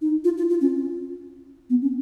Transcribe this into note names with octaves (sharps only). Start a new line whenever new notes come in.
D#4
F4
F4
F4
C#4
B3
C#4